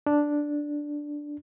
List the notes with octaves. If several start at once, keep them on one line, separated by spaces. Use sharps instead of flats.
D4